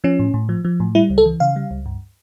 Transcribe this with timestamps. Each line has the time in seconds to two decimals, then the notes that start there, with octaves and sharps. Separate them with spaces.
0.04 F3 C#4
0.19 A2
0.34 A2
0.49 F3
0.65 F3
0.80 A2
0.95 G3 E4
1.10 C#2
1.18 A4
1.25 E3
1.40 C#3 F5
1.56 G3
1.71 C#2
1.86 G2